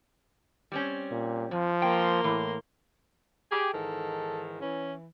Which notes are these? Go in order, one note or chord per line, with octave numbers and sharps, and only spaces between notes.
G3 C4 C#4
A#2
F2 F3
A#3 G5 C6
A2 E3
G4 G#4
G#2 D#3 E3 A4
E3 C#4